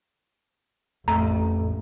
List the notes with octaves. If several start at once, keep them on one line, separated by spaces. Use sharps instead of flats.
A1 F2 A3 A#5